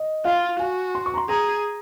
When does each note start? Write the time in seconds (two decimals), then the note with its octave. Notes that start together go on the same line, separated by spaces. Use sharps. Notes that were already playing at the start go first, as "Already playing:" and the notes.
Already playing: D#5
0.25 F4 F5
0.59 F#4 G#5
0.95 C6
1.06 C#6
1.14 A#5
1.17 C6
1.29 G#4 A#5